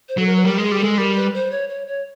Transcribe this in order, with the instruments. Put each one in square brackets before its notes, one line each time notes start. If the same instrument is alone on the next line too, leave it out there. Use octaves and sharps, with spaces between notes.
[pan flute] C5
[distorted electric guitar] F#3 [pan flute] A4
[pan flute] A#4
B4
[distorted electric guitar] G3 [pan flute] A#4
[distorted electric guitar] G#3 [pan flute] G#4
[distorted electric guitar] G3
[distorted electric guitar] G#3 [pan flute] A4
[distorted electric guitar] G3 [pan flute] A#4
[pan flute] B4
C5
C#5
C#5
C#5